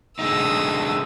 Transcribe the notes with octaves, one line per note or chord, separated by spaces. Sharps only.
D3 G#3 D#4 D#6 E6